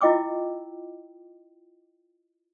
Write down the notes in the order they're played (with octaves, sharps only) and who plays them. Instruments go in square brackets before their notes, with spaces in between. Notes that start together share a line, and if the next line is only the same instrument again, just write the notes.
[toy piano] E4 F4 D#5 G5 D6 E6